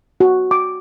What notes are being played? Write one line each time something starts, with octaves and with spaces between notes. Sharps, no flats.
F#4
D6